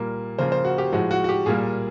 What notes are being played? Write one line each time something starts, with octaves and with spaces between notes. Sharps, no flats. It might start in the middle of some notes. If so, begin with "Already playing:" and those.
Already playing: A#2 G3 A#3
C#3 F3 A#3 C5
C5
F#4
G4
A2 F3 G#3 F#4
F#4
F#4
G4
A#2 G3 A#3 G#4